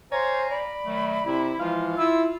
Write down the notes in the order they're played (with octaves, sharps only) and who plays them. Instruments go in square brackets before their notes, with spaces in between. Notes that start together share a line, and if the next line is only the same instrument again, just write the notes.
[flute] C5 [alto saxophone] C#5 [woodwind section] F5 G#5 A#5
[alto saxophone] D5 [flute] B5
[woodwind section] D#3 F#3 A3
[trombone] C3 [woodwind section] E4
[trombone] E3 [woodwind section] F3 G#3 F4 [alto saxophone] F5
[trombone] E4 [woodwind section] F4 [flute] E6